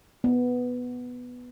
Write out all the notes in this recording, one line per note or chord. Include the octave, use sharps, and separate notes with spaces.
B3